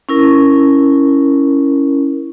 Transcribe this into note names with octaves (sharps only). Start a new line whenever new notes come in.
C#4 E4 A#4